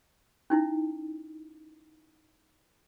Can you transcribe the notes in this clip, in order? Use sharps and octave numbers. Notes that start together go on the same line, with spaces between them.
C#4 D#4 E4